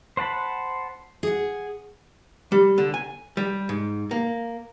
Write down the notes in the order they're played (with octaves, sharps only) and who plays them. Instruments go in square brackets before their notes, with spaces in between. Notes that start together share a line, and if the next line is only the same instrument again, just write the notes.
[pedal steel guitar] C5 F#5 A5 B5
[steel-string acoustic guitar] G#4 F#5
[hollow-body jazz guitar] G3
D3
G#5
G3
G#2
A#3